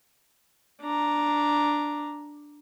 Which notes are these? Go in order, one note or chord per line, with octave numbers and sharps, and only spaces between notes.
D4 A#5